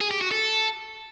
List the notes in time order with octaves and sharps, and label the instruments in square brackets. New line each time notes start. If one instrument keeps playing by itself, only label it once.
[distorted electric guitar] G#4
G4
F#4
A4